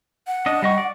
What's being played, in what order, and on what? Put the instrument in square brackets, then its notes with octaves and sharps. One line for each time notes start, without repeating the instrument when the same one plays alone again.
[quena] F#5
[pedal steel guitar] D4 D#5
G3 D#5 C#6
D5